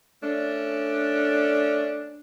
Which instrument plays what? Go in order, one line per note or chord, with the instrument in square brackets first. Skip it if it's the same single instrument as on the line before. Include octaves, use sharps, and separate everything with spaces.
[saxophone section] A3 C#4 D4